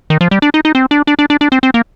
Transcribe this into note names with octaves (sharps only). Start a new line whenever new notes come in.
D#3
F3
G3
D4
D#4
D#4
C4
D4
D4
D4
D4
D4
C4
C4
A#3